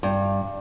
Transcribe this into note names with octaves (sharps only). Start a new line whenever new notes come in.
G2